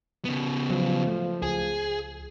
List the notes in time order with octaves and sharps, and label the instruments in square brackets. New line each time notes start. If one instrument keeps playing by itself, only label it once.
[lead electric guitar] C#3 B3
[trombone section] F3 [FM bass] F#3
[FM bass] A3
[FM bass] C#2 [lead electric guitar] G#4